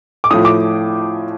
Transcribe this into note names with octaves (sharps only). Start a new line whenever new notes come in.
D6
A2 F3 D#6
D6